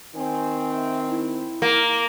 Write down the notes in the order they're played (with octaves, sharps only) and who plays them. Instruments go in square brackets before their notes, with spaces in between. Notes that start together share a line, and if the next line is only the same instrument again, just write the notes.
[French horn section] D#3 C4 [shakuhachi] G#5
[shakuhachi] E5
E4
[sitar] A#3